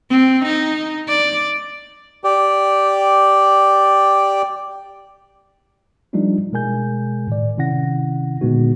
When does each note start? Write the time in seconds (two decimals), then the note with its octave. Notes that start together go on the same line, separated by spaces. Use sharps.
0.10 C4
0.45 D#4
1.08 D5
2.24 G4 D5
6.13 F3 G3 A3 D4 D#4 F4
6.52 B2 G#3 A#4 G#5 G6
7.27 A2 D#3 D5
7.57 C3 D#3 C#4 E4 F#5 A#6
8.41 A#2 D3 G#3 B3 D#4 F#4